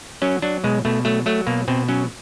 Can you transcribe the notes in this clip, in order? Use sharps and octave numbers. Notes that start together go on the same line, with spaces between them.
F#3 C#4
F#3 D4
B2 G#3
B2 A3
F#3 A3
F#3 A3
B2 A#3
B2 C4
F#3 C#4